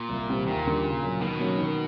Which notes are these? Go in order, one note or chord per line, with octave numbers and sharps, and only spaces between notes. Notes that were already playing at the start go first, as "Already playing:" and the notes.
Already playing: A#2
C2
C3 E3 G3 C4
D#2 A#2
D3 G3 A#3
C#3
F#3 A#3
B2 D#3
F#3 A#3 C#4 F#4
D#3